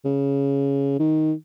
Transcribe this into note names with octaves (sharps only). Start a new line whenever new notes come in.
C#3
D#3